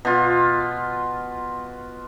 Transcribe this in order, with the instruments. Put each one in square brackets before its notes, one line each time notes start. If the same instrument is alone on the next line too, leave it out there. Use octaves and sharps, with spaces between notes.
[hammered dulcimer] B2 F4